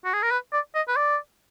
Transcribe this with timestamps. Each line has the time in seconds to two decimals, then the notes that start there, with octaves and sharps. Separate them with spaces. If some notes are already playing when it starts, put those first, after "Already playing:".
0.05 F#4
0.14 G#4
0.22 A#4
0.31 B4
0.53 D5
0.75 D#5
0.88 B4
0.97 D5